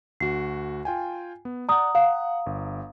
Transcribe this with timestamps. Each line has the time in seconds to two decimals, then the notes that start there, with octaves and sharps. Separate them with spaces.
0.20 D2 F#4 C7
0.85 F4 G5 G#5
1.45 B3
1.69 D5 F#5 A#5 D#6
1.95 F5 F#5
2.46 G1